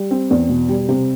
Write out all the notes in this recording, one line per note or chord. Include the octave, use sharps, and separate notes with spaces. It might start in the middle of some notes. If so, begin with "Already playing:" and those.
Already playing: G3
C4
E2
B2
G3
C3